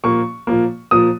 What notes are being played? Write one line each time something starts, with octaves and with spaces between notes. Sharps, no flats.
A#2 F3 A#3 C#6
A#2 F3 A#3
A#2 F3 A#3 D#6